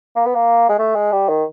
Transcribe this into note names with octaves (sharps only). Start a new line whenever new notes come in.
A#3
B3
A#3
G#3
A3
G#3
G3
D#3